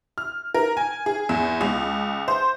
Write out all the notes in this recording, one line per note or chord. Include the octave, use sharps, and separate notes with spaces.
F6
A#4
G#5
G#4
E2
C#2
C5